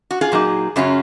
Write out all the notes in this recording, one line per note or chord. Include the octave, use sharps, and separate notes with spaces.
F#4
F4 G#4
A#2 F#3 A#3 D#4
F#2 C#3 F#3 C#4 F4